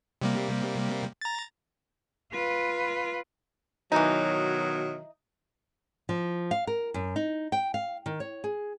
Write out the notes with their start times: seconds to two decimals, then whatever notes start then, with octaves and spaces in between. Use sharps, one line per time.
0.21 C3 G3 A#3
1.21 A#5 A6
2.33 F4 B4
3.92 B2 D#3 E3 F#3 D#4
6.09 F3
6.51 F5
6.67 A#4
6.94 F#2
7.16 D#4
7.52 G5
7.74 F5
8.06 D#3
8.20 C#5
8.44 G#4